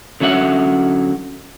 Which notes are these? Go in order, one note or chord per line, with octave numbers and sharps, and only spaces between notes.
D3 F#3 C#4 E5 F#5